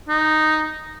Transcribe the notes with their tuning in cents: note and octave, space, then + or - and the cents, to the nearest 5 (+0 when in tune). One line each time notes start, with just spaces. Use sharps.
D#4 -5